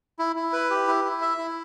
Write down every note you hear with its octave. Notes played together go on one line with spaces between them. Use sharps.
E4
E4
B4
G4
E4
E4
E5
E4